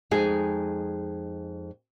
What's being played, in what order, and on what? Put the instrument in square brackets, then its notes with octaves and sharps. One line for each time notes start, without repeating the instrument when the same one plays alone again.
[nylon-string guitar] F2 G#3 D#4 G#4 G#5